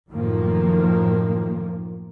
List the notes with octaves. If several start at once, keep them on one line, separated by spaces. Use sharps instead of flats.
F#2 A2 D#3 F3 A#3